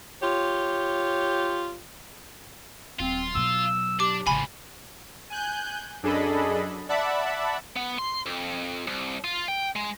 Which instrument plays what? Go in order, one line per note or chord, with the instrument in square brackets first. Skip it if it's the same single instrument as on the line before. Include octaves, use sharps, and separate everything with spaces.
[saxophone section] F4 G4 C#5
[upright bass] D#1 F#3 [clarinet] C4 [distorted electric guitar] F4
[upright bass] B2 F#3 [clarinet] E6
[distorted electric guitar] D4 [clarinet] G4 [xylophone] D6
[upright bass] A1 C#3 [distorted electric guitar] G#2 F3 [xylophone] G#5 B5
[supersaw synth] G#5 F#6 G6
F#2 D4 G#4 A4 D#5 B5
D5 E5 F#5 A5 B5
[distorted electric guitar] B3
C6
F2
C2
F4
G5
G#3